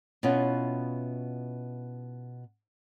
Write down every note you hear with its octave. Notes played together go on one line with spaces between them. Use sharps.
B2 B3 C#4 E4 F4